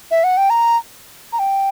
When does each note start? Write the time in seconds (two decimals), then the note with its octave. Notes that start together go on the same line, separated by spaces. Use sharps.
0.11 E5
0.24 F#5
0.37 G5
0.50 A#5
1.33 A#5
1.39 G5